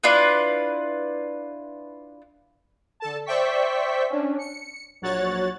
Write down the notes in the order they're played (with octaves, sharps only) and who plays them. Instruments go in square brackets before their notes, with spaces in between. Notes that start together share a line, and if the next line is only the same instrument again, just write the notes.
[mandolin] D4 E4 F4 B4
[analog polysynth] D3 A4 A5
C5 D5 E5 G5 C#6 B6
C#4 D4
C#7
A#1 F#3 F#4 C#5 F#6 A6